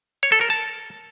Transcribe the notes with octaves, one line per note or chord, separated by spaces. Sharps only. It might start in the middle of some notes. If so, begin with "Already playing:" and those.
C#5
A4
A#4
A5